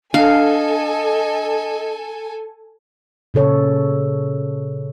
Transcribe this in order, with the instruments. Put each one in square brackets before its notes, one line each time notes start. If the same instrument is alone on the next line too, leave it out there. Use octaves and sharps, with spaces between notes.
[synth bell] D4 [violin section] A4 G#5 [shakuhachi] D#5 [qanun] F5
[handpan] A#2 C#3 A4 C#5